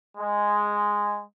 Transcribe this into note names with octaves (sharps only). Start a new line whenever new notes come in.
G#3